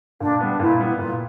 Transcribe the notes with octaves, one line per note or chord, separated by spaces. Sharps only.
A#2 D4
G3 B3
A#2 E4
G3 B3
A#2 F4